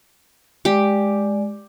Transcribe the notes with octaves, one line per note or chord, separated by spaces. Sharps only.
G#3 G4 D5